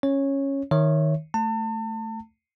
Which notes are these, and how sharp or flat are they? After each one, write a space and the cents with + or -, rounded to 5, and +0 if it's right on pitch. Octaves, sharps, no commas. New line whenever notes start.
C#4 -10 C#5 -10
D#3 +5 C#5 +0 E5 +0
A3 +0 A5 +35